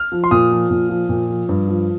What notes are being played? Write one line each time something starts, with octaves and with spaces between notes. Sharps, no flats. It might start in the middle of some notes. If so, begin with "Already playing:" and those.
Already playing: F6
F3
C6
A#2 D#6
F3
A#2
F3
A#2
F3
G2
F3